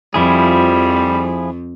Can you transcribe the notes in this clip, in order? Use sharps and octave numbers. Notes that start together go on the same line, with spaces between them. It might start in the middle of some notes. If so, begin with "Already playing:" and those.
F2 F3 G3 E4 G#4